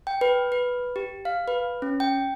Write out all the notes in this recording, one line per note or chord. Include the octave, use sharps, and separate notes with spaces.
G5
B4
B4
G4
F5
B4
C#4
G5